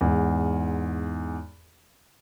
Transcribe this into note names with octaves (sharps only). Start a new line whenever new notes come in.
E2 G#2